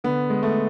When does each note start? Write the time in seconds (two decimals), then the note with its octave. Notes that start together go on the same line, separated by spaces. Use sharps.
0.04 D3 B3
0.30 G#3
0.43 A3